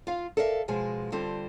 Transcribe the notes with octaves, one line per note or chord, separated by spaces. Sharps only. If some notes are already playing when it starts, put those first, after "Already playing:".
F4 F5
A4 A#4 D5 E5 F5
B2 F3 G#3 G#5
D3 G3 C4 F4 A4